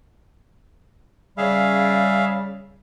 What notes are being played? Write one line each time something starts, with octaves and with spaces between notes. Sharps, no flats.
C#3 G3 G#4 E5 F5